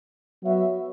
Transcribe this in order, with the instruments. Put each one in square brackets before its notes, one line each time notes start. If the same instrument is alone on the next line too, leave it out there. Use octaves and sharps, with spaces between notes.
[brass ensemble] F#3 B3 F#4 C#5 E5